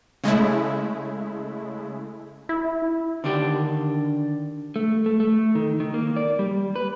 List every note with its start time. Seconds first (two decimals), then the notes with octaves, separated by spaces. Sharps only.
0.24 C#3 G#3 A3 E4
2.49 E4
3.24 D3 D#3 D4 G4
4.76 A3
5.06 A3
5.20 A3
5.55 D#3
5.80 D#3
5.94 A#3
6.16 D5
6.39 G3
6.76 B4